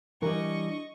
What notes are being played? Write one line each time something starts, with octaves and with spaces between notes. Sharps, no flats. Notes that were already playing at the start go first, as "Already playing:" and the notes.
E3 G3 D4 E4 A#4 D#5 C#6